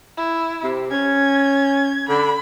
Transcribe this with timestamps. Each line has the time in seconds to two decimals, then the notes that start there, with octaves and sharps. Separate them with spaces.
0.17 E4
0.62 C3
0.91 C#4 G#6
2.09 D3 B5